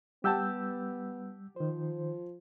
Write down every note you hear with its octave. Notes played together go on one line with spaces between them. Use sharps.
G3 B3 G4 F#5 A5 E6 G6
D#3 F3 C5